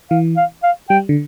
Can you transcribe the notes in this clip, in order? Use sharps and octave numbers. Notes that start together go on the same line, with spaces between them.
E3 F5
F5
F5
G3 G5
D3